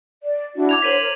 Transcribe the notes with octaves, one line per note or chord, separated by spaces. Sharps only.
D5
D4 E4 F#4
D6 G#6 F7
A#4 C5 C#5 B6 D#7 F#7
A#4